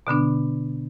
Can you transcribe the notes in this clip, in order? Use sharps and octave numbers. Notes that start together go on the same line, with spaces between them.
B2 D3 B3 D4